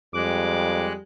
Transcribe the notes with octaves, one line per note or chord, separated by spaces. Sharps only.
F2 G3 G#3 D6 F#6